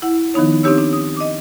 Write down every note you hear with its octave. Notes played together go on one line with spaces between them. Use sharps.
E4 F#5
D#3 F3 B3 D#4 C#5
C4 D4 D#4 G4 C#5 E6
D4
D#6
D#5 D6